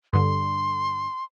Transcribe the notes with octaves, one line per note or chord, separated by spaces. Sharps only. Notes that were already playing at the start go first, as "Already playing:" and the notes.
G2 D3 C6